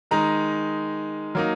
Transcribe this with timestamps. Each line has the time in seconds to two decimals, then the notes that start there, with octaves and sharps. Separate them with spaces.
0.11 D#3 G#3 D#4 A#5
1.35 F#3 A#3 D#4